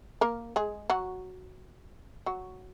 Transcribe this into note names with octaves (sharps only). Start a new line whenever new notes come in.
A#3 A#4
G#3 G#4
F#3 F#4
F#3 F#4